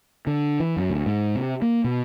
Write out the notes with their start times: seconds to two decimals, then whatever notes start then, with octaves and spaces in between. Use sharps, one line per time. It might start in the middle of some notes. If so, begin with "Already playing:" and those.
0.27 D3
0.60 E3
0.77 F#2
0.90 D2
1.06 G#2
1.35 C3
1.62 A#3
1.84 B2